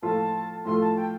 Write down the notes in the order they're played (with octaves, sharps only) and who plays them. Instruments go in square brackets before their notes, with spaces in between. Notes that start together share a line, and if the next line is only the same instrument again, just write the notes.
[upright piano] A2 F3 A3 F4 [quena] A5
[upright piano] A2 F3 A3 F4 [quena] C6
[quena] A5
G5